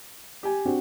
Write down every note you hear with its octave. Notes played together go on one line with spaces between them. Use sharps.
G4 G#5
C4 D4 F#4